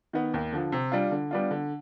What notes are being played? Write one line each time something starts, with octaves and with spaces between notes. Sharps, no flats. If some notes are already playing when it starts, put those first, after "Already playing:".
D#3 B3
D#2
D3 F3
C3
G3 D4 F4
D3
G3 B3 D4 F4
D3